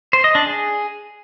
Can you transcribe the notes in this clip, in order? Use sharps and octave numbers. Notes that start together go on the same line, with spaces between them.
C5
D#5
D4
G#4